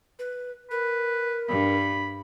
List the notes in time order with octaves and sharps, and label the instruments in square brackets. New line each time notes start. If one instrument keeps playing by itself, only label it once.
[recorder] B4
[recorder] A#4 [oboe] B4
[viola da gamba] G2 [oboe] B5